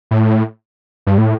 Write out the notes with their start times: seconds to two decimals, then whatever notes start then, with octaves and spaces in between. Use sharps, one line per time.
0.11 A2
1.07 G2
1.18 A2